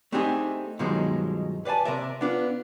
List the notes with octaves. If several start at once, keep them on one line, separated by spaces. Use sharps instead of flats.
A3 C4 D4 D#4 G4 G#4
G2 B2 D#3 F3 F#3 G#3
B4 D5 F5 G#5 A5
C3 A#4 D5 E5
B3 D4 F4